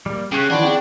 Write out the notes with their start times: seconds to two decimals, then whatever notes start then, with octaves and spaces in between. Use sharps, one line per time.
0.06 G3 A#3
0.32 C#3 G4 C#5 G5 C#6 F#6
0.50 D#3 E3 D4 F#5 B5 C6
0.63 C4 G#4 F#5 G5